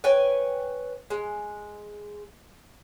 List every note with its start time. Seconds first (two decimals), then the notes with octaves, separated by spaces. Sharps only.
0.04 B4 C#5 G5 G#5
1.10 G#3